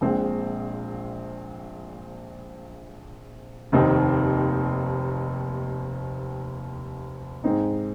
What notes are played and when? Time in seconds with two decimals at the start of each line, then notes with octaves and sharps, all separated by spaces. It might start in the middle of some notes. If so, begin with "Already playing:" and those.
0.01 A#1 A#2 G#3 C4
3.72 F1 D#2 D#3 C4 D#4
7.44 G#2 G#3 C4 D#4